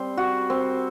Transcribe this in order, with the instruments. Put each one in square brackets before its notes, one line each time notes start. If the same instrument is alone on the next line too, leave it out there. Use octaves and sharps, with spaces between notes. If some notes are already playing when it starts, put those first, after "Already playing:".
Already playing: [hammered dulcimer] G3 C4 C5
F#4
C4